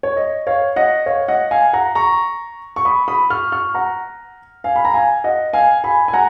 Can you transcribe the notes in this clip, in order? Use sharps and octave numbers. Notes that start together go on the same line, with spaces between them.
C#5
D#5
C#5 F5
D#5 F#5
C#5 F5
D#5 F#5
F5 G#5
F#5 A#5
A#5 C#6
C#6
B5 D#6
B5 D#6
C#6 F6
C#6 F6
F#5 A#5
F5 G#5
B5
A#5
F5 G#5
D#5 F#5
F5 G#5
G#5 B5
G#5
F#5 A#5